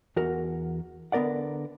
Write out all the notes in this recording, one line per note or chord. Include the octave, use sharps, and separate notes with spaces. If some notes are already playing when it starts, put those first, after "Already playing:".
E2 F#4 A#4
D3 B3 A#4 D5 F#5